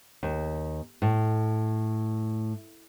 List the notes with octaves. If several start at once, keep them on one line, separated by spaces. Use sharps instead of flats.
D#2
A2